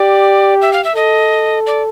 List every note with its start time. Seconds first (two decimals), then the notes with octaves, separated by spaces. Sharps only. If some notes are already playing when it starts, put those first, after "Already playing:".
Already playing: G4 D5
0.62 E5
0.73 F5
0.84 E5
0.96 A4 D#5
1.67 D5